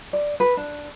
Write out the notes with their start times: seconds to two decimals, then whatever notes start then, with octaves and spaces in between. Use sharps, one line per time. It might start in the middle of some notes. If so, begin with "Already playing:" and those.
0.13 D5
0.40 B4
0.57 D4